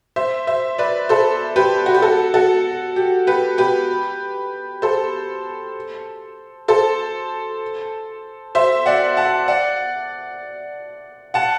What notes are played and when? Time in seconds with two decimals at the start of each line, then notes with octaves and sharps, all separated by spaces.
0.16 C5 E5
0.47 C5 E5
0.78 B4 D5
1.09 A4 C5
1.56 G4 B4
1.86 F#4
1.94 G4
2.02 F#4 A4
2.34 F#4 A4
2.96 G4
3.27 G4 B4
3.58 G4 B4
4.82 A4 C5
6.68 A4 C5
8.55 C5 E5
8.86 D5 F#5
9.17 F#5 A5
9.48 D5 F#5
11.34 F#5 A5